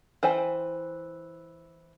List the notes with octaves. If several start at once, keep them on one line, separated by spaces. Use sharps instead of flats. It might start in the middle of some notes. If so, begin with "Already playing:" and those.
E3 C5 G5 G#5